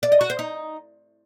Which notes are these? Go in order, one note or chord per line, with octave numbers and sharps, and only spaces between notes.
D5
D#5
F#4
C5
D#4